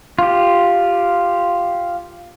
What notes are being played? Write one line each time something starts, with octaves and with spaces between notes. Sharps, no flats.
F4 G4